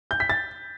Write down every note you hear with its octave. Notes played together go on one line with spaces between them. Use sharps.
G6
B6
A6